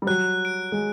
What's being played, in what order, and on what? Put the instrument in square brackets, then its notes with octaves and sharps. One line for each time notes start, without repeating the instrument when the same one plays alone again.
[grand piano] G3
[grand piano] F#3 [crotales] F#6
[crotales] D7
[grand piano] G#3